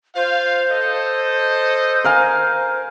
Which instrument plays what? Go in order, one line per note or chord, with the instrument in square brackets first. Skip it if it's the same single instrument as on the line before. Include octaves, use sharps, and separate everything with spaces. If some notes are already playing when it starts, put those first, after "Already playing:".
[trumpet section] F4 F5 [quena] C5
[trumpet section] A4 D#5
[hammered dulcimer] A#4 F5 G#5